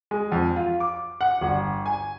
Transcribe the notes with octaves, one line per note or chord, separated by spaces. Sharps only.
G#3
F2
F4
D6
F#5
G1
G#5